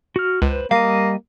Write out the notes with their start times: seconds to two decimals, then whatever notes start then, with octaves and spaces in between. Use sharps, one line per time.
0.16 F#4 F6
0.42 C#2 B4 C5
0.71 G3 A#3 D#5 F5